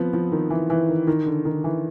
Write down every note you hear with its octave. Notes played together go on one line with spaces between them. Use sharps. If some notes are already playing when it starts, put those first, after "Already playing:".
Already playing: F3 B3 C4
F3
D#3
E3
E3
D#3
D#3
D3
D#3
E3